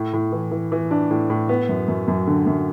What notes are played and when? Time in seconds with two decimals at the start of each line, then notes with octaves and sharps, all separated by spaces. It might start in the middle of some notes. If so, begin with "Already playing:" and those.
Already playing: A2
0.13 A2
0.32 E3
0.51 E3
0.72 E3
0.91 D4
1.10 A2
1.30 A2
1.49 B3
1.69 F#2
1.88 F#2
2.08 F#2
2.27 D3
2.47 F#2